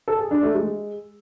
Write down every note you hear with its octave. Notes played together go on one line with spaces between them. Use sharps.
A4
G#4
D4
A3
G#3